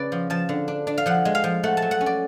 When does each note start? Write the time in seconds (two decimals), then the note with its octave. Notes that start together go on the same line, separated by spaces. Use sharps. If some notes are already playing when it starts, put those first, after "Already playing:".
Already playing: C#3 B4 D5
0.12 F3
0.30 F3 A5
0.49 D3
0.68 D4
0.87 D4
0.98 F5
1.06 F3 F#5
1.25 G#3
1.35 F5
1.44 F3
1.63 A3 F#5
1.77 A5
1.82 F#3
1.91 F#5
2.01 C#4
2.06 D5